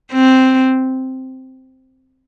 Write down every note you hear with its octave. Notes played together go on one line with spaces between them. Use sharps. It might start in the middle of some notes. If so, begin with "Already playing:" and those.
C4